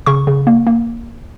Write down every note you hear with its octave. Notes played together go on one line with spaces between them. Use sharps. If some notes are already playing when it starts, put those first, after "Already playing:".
C#3 C#6
C#3
A#3
A#3